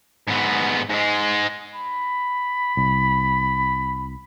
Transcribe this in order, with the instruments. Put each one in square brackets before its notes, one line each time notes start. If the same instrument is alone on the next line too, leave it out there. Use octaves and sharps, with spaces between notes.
[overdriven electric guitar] G#2 B3
G#2 G#3
[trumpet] B5
[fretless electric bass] C2